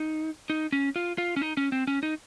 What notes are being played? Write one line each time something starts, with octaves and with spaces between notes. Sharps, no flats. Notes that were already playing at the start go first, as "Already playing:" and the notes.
Already playing: D#4
D#4
C#4
F4
F4
C#4
D#4
C#4
C4
C#4
D#4